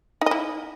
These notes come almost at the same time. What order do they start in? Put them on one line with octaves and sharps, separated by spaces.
D#4 D#5 E4